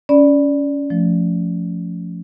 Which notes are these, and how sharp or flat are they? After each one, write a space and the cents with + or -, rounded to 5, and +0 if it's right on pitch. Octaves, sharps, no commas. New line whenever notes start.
C#4 +20 D5 +0 B5 -5
F3 +0 A3 +5